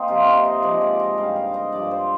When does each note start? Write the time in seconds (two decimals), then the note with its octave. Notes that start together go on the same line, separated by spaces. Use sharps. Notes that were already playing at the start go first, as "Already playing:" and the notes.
Already playing: A#3 C4 D#4
0.08 C3 F3 F4
0.45 D#5
0.63 G#2 F3 D5
0.82 D5
1.00 D#5
1.18 G2 D#3 G3 F5
1.36 F5
1.54 D#5
1.72 G2 F3 D5
1.91 C5